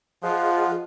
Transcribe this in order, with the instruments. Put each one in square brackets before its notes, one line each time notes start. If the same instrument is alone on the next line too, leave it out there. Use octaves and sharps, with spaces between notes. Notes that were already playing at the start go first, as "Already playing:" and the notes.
[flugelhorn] F3 [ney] F4 [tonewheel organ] G#4 D#5 F#5